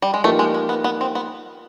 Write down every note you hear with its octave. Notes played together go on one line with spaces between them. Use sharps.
G3
G#3
F3 A3 A#3 D#4 G4 A#4
G#3
G#3
B3
B3
C4
B3